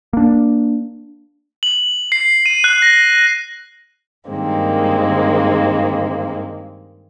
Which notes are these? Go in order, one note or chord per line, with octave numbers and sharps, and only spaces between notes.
A#3 D4
F#7
C7
D#7
F#6
A#6
G2 D#3 G#3 A#3 C4